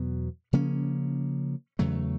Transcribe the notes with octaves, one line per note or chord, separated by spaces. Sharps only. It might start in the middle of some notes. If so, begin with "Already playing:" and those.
Already playing: E2 B2 F#3 B3
C#3 F3 A#3 C#4
E2 C#3 F#3 A3